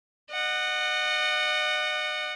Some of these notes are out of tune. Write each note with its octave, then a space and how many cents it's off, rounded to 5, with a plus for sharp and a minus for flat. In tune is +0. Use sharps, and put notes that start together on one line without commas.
D#5 -40 F#5 +0